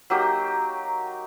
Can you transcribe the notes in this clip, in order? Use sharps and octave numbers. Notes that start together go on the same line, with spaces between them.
F#3 A#3 D#4 G4